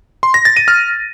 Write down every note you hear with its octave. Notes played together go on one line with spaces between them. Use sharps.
C6
A#6
A6
D#7
F6